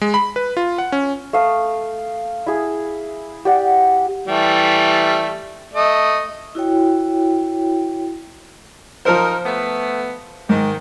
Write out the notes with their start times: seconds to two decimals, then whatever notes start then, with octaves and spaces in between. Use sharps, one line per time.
0.01 G#3
0.14 B5
0.36 B4
0.57 F4
0.78 F#5
0.92 C#4
1.33 A3 F5 D#6
2.47 E4 G#4
3.45 G4 D5 F#5
4.28 E3 G3 A3
5.74 A3 D#5
6.55 E4 F#4 C#5 G5
9.05 F3 D#4 A#4 C5
9.45 A3 B3
10.49 G#2 D#3